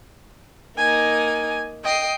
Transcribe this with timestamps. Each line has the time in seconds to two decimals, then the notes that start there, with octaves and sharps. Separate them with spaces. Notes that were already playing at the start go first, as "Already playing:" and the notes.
0.78 A#3 D#4 G#5
1.84 D#5 G5 C7